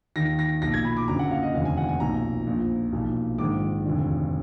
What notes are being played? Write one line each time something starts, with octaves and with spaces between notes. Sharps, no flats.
D#2 D#3 A#6
A#6
B1 A#2 F3 A#6
G#6
B5
D6
F#1 F#2 D3 A#5
F#5
F5
D#5
F1 D#2 D3 F5
G#5
F#5
G#5
B1 A#2 F3 A#5
A#1 A#2 F3
B1 A#2 F3
A#1 G#2 D#3 D6
F1 D#2 D3